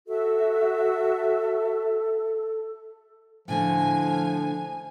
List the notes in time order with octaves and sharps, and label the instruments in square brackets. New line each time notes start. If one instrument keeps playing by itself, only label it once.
[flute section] F#4 E5 [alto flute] A4
[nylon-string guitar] A2 D3 A3 [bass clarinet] F3 [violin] G#5